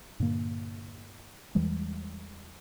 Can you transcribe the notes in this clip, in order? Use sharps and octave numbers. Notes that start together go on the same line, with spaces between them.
G2 A#2 D3 A#3
E2 E3 G3 G#3